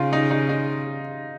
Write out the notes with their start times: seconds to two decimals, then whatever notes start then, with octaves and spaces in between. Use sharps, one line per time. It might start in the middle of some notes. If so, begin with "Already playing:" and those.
Already playing: C#3 D#4 F4
0.13 D#4
0.31 D#4
0.49 D#4